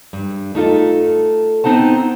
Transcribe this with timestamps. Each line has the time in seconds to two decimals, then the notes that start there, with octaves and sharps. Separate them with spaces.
0.13 G2
0.55 A3 D#4 F4 A4
1.64 B3 C4 D#4 F#5 A5